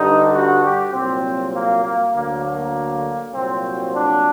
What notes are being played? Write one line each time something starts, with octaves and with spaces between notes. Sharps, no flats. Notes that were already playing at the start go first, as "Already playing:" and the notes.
Already playing: G2 D3 G3 D#4
F#4
G4
C2 A#2 F#3 C4
A#3
A#3
D2 D3 F#3 A#3
A#3
C2 A#2 F#3 C4
D4